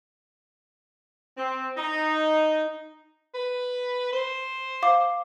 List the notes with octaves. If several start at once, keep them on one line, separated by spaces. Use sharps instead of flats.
C4
D#4
B4
C5
F5 D6